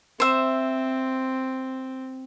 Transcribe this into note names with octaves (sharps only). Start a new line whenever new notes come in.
C4 C5 E5